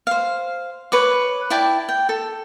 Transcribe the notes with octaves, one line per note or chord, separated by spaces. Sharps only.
C5 F5
B4 C#5 D6
E4 D5 G5 A5
G5
A4